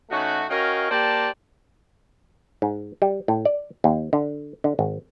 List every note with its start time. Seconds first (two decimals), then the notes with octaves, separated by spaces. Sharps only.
0.10 C#3 A3 D#4 F#4
0.49 C#4 F#4 A#4 D#5 F5 G5
0.90 A#3 G4 C5 D5 A5
2.62 G#2
3.02 G3
3.28 A2
3.45 D5
3.84 D#2
4.13 D3
4.64 D3
4.79 G#1